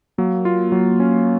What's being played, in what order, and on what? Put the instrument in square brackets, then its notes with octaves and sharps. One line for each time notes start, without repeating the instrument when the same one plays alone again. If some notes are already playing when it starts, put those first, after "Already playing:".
[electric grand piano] F#3 [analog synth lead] A#3
[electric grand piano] F4
F#3
C#4